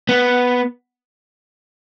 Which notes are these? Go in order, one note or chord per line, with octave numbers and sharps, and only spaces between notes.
B3